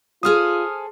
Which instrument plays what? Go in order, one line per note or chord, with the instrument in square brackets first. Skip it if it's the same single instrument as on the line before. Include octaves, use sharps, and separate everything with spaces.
[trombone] F4 [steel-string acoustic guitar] G#4 A4 C5 [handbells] D#6 F6